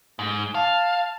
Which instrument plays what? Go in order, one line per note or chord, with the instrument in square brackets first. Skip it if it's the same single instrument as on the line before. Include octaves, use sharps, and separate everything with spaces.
[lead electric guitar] G#2
[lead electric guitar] F5 [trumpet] A5